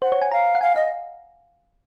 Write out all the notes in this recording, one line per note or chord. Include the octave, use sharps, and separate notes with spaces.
C5 F#5
C#5
G#5
F5 A#5
F#5
F5 G#5
D#5 F5